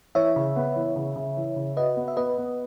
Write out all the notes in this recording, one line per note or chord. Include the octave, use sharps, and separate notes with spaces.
E3 C#5 E5
C#3
B3
E3
C#3
C#3
E3
C#3
F#4 B4 D#5
B3
E5
B3 B4 D#5
B3